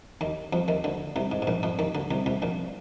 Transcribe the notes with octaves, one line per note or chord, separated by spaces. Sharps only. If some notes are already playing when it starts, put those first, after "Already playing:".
D#2 D#3
F2 F3
D#2 D#3
D2 D3
C2 C3
G#2
G#2
A#1 A#2
F2 F3
D#2 D#3
D2 D3
C2 C3
C2 C3
A#1 A#2